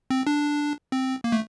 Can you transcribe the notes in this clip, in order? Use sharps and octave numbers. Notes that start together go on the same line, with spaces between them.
C4
D4
C4
A#3
A3